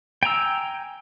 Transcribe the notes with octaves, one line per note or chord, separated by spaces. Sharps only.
G5 G#5 A#5 E6